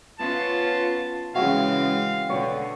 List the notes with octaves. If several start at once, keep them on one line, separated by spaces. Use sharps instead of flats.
B3 C#4 F4 A5
C#3 E3 G#3 C4 F#4 E5 F5
B2 D3 C#5